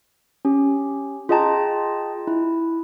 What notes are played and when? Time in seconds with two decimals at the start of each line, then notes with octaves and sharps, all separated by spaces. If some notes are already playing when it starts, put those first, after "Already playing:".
0.45 C#4 G4
1.29 F4 G#4 D#5 G5 A5 A#5
2.27 E4